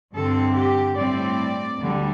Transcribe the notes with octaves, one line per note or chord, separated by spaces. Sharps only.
G2 D3 C4 A4
G4
A2 G3 C4 D5
D2 D3 G3